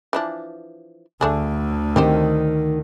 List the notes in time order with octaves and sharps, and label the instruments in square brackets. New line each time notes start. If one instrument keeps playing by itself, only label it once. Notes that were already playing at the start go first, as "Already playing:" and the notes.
[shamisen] E3 F3 D4
[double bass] D2 D3 [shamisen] A3 D4 G#4
[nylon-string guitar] D#3 [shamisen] C4 G4 C5